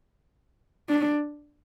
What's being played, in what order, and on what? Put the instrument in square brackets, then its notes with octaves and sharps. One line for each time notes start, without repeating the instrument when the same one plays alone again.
[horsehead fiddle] D4